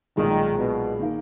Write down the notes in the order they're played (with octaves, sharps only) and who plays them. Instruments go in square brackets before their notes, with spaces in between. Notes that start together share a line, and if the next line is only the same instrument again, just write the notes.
[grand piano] B1 A#2 G#3 [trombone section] D#3
[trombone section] B2
[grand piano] D#3 A#3